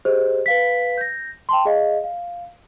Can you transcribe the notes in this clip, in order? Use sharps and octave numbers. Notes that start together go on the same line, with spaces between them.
G4 G#4 C5 D#5
B4 F5 B6
G6 A#6
G5 A5 C6
G#4 D#5 F5
F5